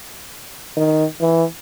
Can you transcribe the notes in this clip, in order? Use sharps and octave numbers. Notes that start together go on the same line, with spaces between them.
D#3
E3